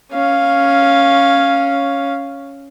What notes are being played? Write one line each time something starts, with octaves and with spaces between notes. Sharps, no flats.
C#4 F5